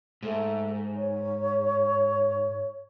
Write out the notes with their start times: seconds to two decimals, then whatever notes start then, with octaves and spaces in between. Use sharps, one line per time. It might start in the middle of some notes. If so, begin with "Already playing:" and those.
0.22 G#2 A3
0.95 C#5